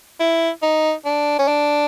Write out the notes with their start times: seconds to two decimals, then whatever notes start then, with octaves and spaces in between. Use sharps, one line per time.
0.20 E4
0.63 D#4
1.05 D4
1.39 C#4
1.48 D4